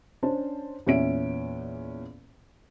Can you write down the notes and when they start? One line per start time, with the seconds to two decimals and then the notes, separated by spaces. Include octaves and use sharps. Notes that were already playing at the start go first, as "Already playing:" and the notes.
0.23 C#4 D4 C5 A5
0.87 E2 A#2 C#4 E5 D7